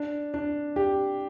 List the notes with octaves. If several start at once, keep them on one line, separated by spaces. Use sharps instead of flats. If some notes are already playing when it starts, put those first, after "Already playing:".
Already playing: D4
D4
G4